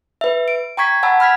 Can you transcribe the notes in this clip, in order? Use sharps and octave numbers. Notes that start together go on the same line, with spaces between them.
B4 E5
D7
G5 A#5 C#6 G#6 B6
F#5 A5 B5 E6
B5 F6 G#6 B6